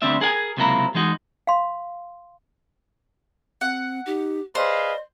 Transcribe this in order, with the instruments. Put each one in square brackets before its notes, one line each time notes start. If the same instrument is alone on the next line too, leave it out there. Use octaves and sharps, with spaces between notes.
[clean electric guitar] D2 D3 G3 C4 D4 E5
G#4 A#4 F#5 G#5
C#2 C3 F#3 A#3 E4 A#5
E3 G#3 D#4 F#4
[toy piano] F5 C6
[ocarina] C4 [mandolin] F#5
[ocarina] D#4 [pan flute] G4
[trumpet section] G#4 B4 F5 [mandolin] C5 C6 [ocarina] D5 [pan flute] D#5